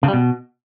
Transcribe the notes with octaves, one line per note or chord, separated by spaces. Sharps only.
C#3
G3
B2